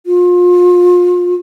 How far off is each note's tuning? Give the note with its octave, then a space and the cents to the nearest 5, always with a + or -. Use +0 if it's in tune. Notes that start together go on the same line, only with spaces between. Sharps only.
F4 +30